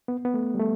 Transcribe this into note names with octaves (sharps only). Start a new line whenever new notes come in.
B3
B3
A3
G3
A3